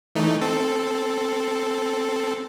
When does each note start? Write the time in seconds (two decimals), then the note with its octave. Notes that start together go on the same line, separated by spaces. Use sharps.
0.15 E3 A3 D#4
0.41 C4 A4